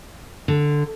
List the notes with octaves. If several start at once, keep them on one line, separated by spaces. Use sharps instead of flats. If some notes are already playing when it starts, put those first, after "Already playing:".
D3